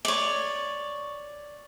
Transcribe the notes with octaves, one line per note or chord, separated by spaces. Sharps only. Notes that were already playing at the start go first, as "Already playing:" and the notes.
C#5 D5